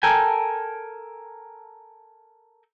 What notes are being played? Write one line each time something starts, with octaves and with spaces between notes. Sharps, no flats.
A4 A#4 G5 G#5